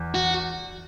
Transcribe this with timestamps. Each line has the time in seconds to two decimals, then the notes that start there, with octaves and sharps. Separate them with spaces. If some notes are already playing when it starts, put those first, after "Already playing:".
Already playing: E2
0.15 F#4